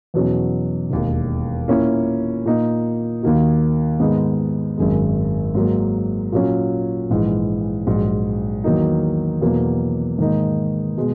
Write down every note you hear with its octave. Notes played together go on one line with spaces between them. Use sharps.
E2 B2 F#3 C#4
E1 D#2 D#3
A#2 A#3 C#4 E4
A#2 A#3 D#4
D#2 D#3 A#3 D#4 F#4
G#2 D#3 G#3 B3 D#4
G#1 F#2 D#3 G#3
G#2 F#3 A#3
A#2 F#3 C#4
A#1 G#2 E3
A#1 G#2 F#3
E2 D#3 F#3 A#3 D#4
E2 B2 F#3 A#3
G#2 D#3 A#3 D#4
B2 G#3